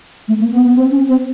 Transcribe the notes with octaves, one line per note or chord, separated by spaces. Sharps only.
A3
A#3
B3
B3
C4
C#4
C4